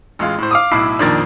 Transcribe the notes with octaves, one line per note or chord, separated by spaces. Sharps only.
A1 G#3 F4
A2 C5
F5 D6 D#6
B1 A2 E4 B5 D6 C7
F2 A#2 D#3 D4 A#4 A6